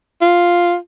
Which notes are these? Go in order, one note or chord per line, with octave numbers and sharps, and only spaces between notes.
F4